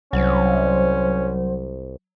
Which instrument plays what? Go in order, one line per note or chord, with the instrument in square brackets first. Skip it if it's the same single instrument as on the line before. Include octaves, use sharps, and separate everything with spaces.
[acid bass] C2 [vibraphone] F#3 [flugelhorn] C#4 [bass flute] C5